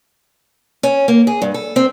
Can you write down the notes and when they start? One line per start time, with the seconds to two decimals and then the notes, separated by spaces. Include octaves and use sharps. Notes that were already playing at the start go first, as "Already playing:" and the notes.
0.83 C#4
1.08 A#3
1.27 G#4
1.42 G2
1.54 A4
1.76 C4